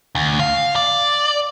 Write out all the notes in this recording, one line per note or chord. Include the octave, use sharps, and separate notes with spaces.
D2
F5
D5